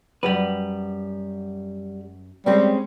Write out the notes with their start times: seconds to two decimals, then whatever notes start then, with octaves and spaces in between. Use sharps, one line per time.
0.23 F#2 G3 G4 B4
2.46 G3 G#3 C4 C#4